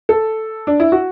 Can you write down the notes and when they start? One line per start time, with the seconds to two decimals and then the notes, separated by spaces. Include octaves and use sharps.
0.09 A4
0.67 D4
0.80 E4
0.92 F#4